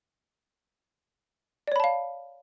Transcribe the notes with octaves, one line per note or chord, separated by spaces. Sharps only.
C#5 D5 F5 A5 B5